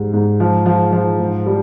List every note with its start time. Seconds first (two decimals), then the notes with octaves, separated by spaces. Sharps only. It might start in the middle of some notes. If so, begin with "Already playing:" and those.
Already playing: G#2 G3
0.13 G#2
0.40 F3
0.66 F3
0.92 F3
1.20 G#2
1.46 G3